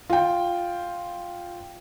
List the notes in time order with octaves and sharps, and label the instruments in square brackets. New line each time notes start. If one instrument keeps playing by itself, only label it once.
[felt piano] F4 G5